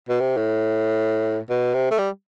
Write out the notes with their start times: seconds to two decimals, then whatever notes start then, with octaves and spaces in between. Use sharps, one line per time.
0.09 B2
0.20 C3
0.37 A2
1.50 B2
1.74 C3
1.91 A3
1.98 G3